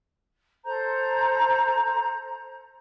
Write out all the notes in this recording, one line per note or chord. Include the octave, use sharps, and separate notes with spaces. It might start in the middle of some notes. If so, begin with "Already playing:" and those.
A4 C5 A#5 G6